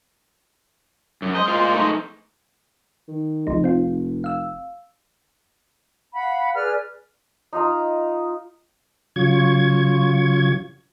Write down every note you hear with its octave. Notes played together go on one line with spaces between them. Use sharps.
F#2
G#3 C5 D#5
F4 A#4 F5
A3 D#4
D#3
F1 C#2 F3 D#4
C4 F4
F5 E6
F5 F#5 B5
G#4 B4 D5 F6
D#4 F4 F5 A#5
C#3 F#3 F4 C#6 G#6